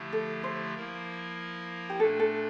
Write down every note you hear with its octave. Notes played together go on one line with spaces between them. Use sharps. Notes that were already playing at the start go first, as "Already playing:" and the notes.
Already playing: D3 F3 A3 E4 G4
A4
C5
F3 A#3 E4 A#4
G4
A#2 A3 D4 A4
A4